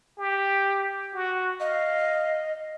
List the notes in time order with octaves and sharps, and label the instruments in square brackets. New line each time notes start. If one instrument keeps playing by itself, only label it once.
[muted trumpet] G4
F#4
[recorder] D#5 [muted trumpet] F5